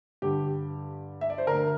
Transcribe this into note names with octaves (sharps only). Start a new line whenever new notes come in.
G2 D3 G4
E5
D5
C5
D2 D3 A#4